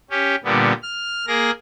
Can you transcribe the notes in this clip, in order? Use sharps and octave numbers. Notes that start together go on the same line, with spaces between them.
C#4 G4
A#2 D3 G3 B3
F6
A#3 G#4 A#4 A#6